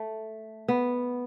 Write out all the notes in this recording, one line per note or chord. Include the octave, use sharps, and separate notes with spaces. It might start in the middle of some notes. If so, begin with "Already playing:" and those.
Already playing: A3
B3